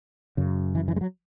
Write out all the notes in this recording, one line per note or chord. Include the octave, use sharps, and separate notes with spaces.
F#2 C#3
E3
E3
G#3
F#3